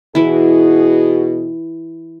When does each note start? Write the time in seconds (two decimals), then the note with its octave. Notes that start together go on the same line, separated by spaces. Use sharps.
0.15 B2 E3 E4 F#4 G#4